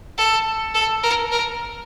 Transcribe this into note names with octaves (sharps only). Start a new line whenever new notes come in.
A4
A4
A#4
A#4